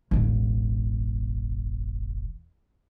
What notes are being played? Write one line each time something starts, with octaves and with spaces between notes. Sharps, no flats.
E1 A1